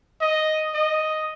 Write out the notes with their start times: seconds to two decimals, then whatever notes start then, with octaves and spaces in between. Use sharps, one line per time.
0.21 D#5
0.74 D#5